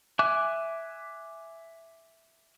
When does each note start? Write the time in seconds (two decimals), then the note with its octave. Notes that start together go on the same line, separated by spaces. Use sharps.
0.19 E5 G#5 D6 F#6